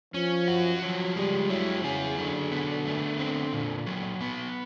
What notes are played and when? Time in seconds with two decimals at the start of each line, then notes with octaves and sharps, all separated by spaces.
0.14 F3 C#4
0.48 F#4
0.82 F3 F#3
1.16 G3 G#3
1.50 F#3 E4
1.83 C#3 G#4
2.18 D3 F#3
2.51 B3
2.85 A3
3.19 C4
3.53 A#2
3.86 F#3
4.21 B3